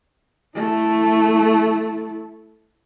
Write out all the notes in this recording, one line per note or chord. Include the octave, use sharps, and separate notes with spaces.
A3 E4